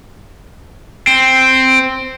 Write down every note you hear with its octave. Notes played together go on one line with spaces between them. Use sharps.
C4